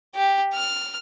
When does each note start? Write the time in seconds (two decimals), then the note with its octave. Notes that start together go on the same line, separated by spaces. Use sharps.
0.15 G4
0.53 F6